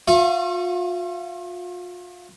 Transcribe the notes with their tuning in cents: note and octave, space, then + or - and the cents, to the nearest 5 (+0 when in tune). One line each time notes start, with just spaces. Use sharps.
F4 +40 F5 -45 C#6 -15